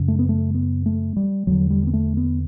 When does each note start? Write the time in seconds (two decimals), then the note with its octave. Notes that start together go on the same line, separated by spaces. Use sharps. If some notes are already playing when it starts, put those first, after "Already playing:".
Already playing: F#2 C#3
0.08 A3
0.19 B3
0.29 A3
0.54 B3
0.86 A3
1.16 G3
1.47 E2 D3 F#3
1.70 G3
1.87 B3
1.93 A3
2.17 B3